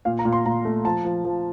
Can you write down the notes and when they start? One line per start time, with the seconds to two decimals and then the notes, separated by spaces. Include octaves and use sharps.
0.05 A#2 F5
0.19 A#5
0.25 A#2
0.33 C6
0.45 A#2 A#5
0.65 A3
0.85 F3 A5
1.05 F3
1.25 F3